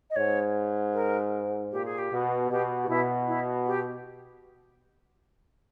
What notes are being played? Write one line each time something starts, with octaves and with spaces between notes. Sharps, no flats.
D#5
G#2 C#5
A#4
A#2 G4
G#4
G4
B2
B2 G4
G4
B2 E4
E4
G4